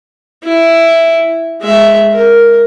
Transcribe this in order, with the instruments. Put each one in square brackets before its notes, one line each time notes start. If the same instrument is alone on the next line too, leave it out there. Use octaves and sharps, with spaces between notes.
[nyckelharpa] E4
G#3 E5
A#4